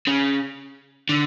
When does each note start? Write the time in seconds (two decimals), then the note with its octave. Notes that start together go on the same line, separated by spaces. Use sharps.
0.07 C#3
1.09 D3